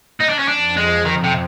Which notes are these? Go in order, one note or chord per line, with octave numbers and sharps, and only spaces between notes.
D#4
D4
C#4
F2 D4
F2 G#3
D#3
C3